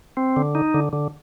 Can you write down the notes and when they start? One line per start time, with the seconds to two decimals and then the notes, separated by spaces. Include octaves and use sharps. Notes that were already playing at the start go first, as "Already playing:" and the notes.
0.17 C4
0.36 D3
0.55 D#4
0.74 D3
0.93 D3